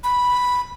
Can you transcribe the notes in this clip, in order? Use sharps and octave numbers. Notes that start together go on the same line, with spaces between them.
B5